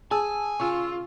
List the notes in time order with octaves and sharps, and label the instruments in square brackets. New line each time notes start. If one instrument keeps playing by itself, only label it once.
[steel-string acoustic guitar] G#4 [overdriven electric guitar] G#5 [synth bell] A5 E6
[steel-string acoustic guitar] C#3 [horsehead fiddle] F4 [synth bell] C#6 E6